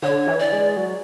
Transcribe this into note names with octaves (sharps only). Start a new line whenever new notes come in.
D3 C#5
E3
D5
G#3
F#3